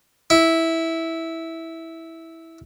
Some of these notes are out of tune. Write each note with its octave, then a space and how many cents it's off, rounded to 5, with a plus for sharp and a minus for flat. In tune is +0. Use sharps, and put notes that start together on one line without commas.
E4 -10